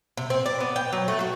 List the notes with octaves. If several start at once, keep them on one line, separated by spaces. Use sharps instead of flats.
C3
C4
D5
B3
G5
F#3
A3
F#4